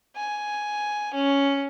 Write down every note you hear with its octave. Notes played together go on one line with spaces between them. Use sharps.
G#5
C#4